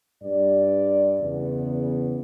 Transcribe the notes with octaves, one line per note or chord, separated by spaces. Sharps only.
G2 D5
E2 C#3 B3